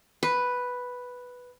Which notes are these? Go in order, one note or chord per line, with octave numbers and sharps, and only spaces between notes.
B4